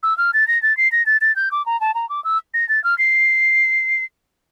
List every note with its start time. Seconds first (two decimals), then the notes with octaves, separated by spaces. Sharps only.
0.03 E6
0.18 F6
0.34 A6
0.48 A#6
0.62 A6
0.77 C7
0.92 A#6
1.06 A6
1.21 A6
1.36 G6
1.51 D6
1.66 A#5
1.81 A5
1.95 A#5
2.09 D6
2.24 E6
2.54 A#6
2.69 A6
2.84 F6
2.98 C7